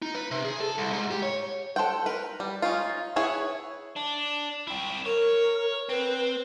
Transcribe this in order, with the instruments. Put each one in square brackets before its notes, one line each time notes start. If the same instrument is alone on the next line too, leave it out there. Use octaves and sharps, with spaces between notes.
[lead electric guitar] D#4
B4
C3
G#4
A4
C2
G#2
G4
C#5
[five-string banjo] A4 C5 F#5 G5
A#4 B4
G3
C#4 D#4 F4
E4 G#4 B4 C#5
[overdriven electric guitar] D4
C4 E4
[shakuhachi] A#4 [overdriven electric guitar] C#5
[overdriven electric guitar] C4 [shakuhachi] B4